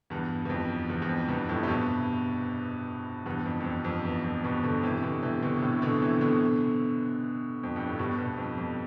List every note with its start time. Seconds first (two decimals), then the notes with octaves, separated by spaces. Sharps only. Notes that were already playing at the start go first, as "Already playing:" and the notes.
0.10 E2 G2
0.45 E2
0.50 F2
0.90 E2
1.02 E2
1.09 F2
1.28 E2 G2
1.49 F2 A2
1.63 C3
1.68 G2 B2
3.26 E2 G2
3.45 F2
3.61 G2
3.65 F2
3.85 F2
4.05 E2
4.24 F2
4.44 G2 B2
4.64 B2 D3
4.83 C3 E3
5.03 B2 D3
5.22 C3 E3
5.42 B2 D3
5.57 D3
5.62 A2 C3
5.82 B2 D3
6.02 C3 E3
6.21 B2 D3
7.63 F2
7.76 G2
7.87 A2
7.99 G2 B2
8.18 G2 B2
8.38 F2
8.58 F2